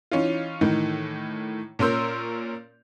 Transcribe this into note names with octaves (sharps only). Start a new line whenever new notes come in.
E3 C#4 D#4 F4
A2 D#3 E3
A#2 C#4 A#4 C6 E6 G6